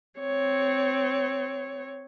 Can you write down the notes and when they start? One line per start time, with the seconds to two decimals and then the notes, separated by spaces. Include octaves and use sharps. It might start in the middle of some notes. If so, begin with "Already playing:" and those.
0.20 C4 C#5